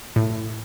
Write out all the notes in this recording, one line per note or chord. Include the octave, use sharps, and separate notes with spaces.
A2